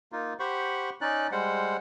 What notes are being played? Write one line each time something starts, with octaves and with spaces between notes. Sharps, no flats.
A#3 D#4 F4
G4 C5 F#5 B5 C#6
C#4 D#4 D5 F#6
G3 G#3 C5 F#5